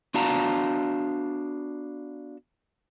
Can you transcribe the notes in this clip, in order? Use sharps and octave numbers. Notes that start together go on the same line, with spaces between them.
B3 D4 F#4 F5 A5 A#5